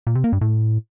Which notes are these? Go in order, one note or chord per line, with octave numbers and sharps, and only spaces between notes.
A#2
C3
A#3
G2
A2